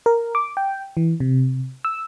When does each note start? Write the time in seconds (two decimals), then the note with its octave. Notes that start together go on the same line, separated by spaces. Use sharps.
0.06 A#4
0.35 D6
0.57 G5
0.97 E3
1.20 C3
1.85 E6